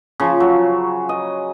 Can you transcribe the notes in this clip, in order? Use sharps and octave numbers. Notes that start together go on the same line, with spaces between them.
C#3 F3
F#3
D#5